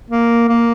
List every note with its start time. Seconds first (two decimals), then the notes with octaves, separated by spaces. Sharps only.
0.11 A#3
0.49 A#3